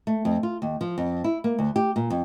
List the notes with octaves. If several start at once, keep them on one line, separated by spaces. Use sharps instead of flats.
A3
F2
F4
D#2
F3
F2
E4
A#3
D2
G4
A#2
F2